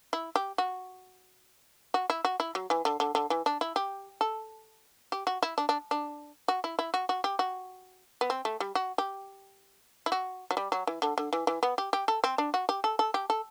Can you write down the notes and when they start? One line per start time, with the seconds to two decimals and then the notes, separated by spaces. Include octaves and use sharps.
0.13 E4
0.36 G4
0.58 F#4
1.94 F#4
2.10 E4
2.25 F#4
2.40 E4
2.55 F#3
2.70 E3
2.85 D3
3.00 D3
3.15 D3
3.30 E3
3.46 D4
3.61 E4
3.76 G4
4.21 A4
5.12 G4
5.27 F#4
5.43 E4
5.58 D4
5.69 D4
5.91 D4
6.48 F#4
6.64 E4
6.79 E4
6.94 F#4
7.09 F#4
7.24 G4
7.39 F#4
8.21 B3
8.30 C4
8.45 A3
8.60 G3
8.75 F#4
8.98 G4
10.06 E4
10.12 F#4
10.51 F#3
10.57 G3
10.72 F#3
10.87 E3
11.02 D3
11.18 D3
11.33 E3
11.47 E3
11.63 B3
11.78 G4
11.93 G4
12.08 A4
12.24 C4
12.38 D4
12.54 F#4
12.69 G4
12.84 A4
12.99 A4
13.14 G4
13.30 A4